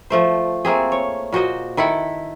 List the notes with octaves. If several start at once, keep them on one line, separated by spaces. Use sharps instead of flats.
F3 A3 C5
A3 A#3 C4 G#4
C#5
A#2 F#4 C5 D#5
D#3 E4 A4 F#5